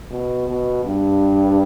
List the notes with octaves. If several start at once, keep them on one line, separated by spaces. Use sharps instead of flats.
B2
B2
G2